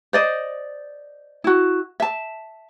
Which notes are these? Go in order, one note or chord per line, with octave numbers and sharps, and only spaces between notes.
C5 D5 D#5
E4 F#4
E5 A5